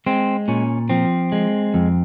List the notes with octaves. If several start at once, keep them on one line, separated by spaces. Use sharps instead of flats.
G#3 C4
A#2 C#4
F3 C4
G#3
F2